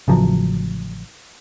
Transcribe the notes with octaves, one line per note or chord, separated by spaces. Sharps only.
A1 C#3 F3 F#3